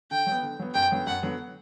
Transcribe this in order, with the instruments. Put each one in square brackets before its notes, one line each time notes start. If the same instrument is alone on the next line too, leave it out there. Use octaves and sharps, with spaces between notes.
[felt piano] D3 [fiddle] G5
[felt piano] F#3
B3
D3
F#3 B3
[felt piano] F#2 [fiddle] G5
[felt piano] D3 F#3 B3
[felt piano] F#2 [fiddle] F#5
[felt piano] D3 F#3 B3